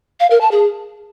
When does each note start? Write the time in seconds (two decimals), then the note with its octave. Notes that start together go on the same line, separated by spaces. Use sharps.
0.20 F5
0.30 A#4
0.41 A5
0.51 G#4